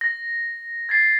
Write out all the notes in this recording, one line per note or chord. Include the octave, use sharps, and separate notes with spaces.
A#6
G#6 A6 C7